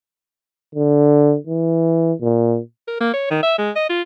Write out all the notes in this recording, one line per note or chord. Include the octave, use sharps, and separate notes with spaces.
D3
E3
A#2
A#4
A#3
C#5
D#3
E5
G#3
D#5
F4